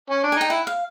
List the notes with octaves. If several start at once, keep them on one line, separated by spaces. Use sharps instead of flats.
C#4
D4
G#5
D#4 G5
E4 F#5
F5